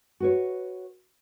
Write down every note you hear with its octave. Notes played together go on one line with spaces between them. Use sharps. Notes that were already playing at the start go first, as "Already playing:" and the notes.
F#4 B4 C#5